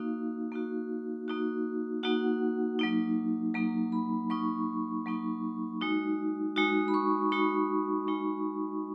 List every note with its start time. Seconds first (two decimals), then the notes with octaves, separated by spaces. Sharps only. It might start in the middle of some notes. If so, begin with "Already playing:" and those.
Already playing: A#3 D#4 F#4 F5
0.52 A#3 D#4 F#4
1.28 A#3 D#4 F#4
2.03 A#3 D#4 F#4 F#5
2.79 F#3 A#3 D#4
3.54 F#3 A#3 D#4 A#5
3.92 B5
4.30 F#3 A#3 D#4 C#6
5.06 F#3 A#3 D#4
5.81 G#3 D#4 F#4
6.56 G#3 D#4 F#4 D#6
6.88 B5
6.94 C#6
7.32 G#3 D#4 F#4 B5
8.07 G#3 D#4 F#4